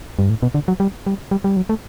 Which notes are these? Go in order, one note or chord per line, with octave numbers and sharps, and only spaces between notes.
G2
A2
B2
D3
F#3
G3
G3
G3
G3
F#3
A3